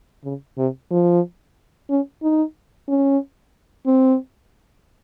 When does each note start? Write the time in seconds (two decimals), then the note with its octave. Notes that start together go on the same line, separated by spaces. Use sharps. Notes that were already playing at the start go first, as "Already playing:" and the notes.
0.24 C#3
0.58 C3
0.91 F3
1.90 C#4
2.23 D#4
2.88 C#4
3.86 C4